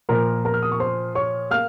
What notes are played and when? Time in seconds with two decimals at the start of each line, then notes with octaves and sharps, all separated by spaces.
0.09 A#2 F3 A#3 A#4 A#5
0.45 A#4 A#5
0.54 F6
0.62 D#6
0.72 C#6
0.80 C5 C6
1.15 C#5 C#6
1.50 A#3 F5 F6